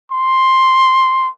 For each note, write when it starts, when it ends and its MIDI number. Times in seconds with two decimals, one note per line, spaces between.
0.11 1.29 84